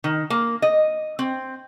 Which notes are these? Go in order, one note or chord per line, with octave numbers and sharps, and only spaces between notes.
D#3
A#3
D#5
C4